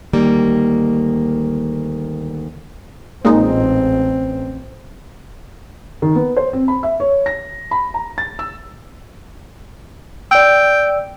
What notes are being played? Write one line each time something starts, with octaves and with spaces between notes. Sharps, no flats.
D2 D#3 G3 A#3
A1 A#2 G#3 C4 D#4
D#3
B3
C5
C4
B5
E5
C#5
A#6
B5
A#5
A6
E6
D5 G5 E6